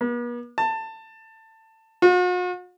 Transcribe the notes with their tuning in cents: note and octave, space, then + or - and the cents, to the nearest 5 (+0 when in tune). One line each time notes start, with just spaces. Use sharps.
B3 -45
A5 +20
F#4 -45